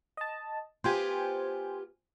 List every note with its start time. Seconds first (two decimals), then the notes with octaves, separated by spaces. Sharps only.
0.17 D#5 A5
0.84 B3 F4 G4 C5 G5 G#5